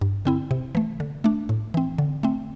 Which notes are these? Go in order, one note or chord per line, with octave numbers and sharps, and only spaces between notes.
G2
D3 C4 E4
C3
E3 A3
D3
A3 D4
A2
E3 C4
D3
A3 C4